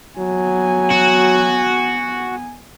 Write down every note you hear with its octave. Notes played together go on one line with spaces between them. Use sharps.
F#3 B3 G#5
F#4